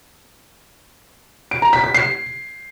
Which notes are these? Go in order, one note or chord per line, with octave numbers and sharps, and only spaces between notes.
D7
A#5
B6
B6
C7